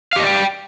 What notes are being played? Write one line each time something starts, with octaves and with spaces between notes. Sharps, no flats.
G4 D5 D#5 F5 G5